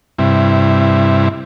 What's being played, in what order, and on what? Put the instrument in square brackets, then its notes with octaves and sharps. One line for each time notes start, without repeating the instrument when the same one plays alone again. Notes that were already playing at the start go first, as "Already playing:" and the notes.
[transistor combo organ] G2 C3 E4